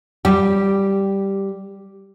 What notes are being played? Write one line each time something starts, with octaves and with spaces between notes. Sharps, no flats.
G3 G4